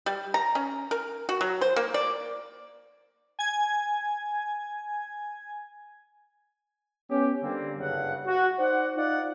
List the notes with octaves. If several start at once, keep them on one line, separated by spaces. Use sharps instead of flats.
G3
A#5
C#4
A#4
F#4
F#3
C5
A#3
D5
G#5 G#6
B3 C#4 G4
D3 G3 A#3 C4
F#1 G2 C#3 F#5
F#4
D#4 C5 D5 F#5
D#4 F4 D5 F#5